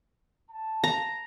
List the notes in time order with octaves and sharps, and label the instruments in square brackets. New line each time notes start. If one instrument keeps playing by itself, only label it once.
[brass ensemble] A5
[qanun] A#5